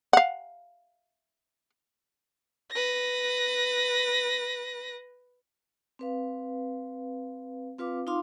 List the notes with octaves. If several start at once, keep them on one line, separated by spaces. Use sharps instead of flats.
F5 F#5
B4 A#6
C4 B4 F5
C4 F4 B4 F5 D6
D#4 F4 F5 C6 D6